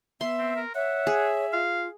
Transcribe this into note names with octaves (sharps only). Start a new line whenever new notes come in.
B3 E5 C6
C4
A#4
C#5 E5 F#5
G#4
F4 F5